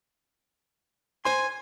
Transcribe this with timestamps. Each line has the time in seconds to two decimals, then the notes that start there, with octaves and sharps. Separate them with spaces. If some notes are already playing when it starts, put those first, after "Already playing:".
1.25 C5 G#5 C6